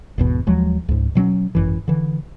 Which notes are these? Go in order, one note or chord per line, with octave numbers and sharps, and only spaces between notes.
G#1 E2 B2
D#2 F3 F#3 G#3
C#2 G#2
B2 F#3 C4 C#4
G#1 F#2 E3
D3 E3